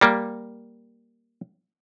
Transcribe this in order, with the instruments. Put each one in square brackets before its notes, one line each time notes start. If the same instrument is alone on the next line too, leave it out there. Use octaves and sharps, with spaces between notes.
[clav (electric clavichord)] G3 A#3